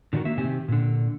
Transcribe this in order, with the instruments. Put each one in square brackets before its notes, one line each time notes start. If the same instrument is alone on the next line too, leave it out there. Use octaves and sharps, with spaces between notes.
[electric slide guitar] D3 D#3 D4 D#4 F#4 A#4
A#3 E5
C3 D#3 C4 G4 G#5
A#2 D3